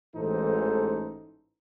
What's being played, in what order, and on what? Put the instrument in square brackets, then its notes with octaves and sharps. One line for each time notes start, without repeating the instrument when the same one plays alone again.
[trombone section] A1 G#2 E3 D#4 A4 C5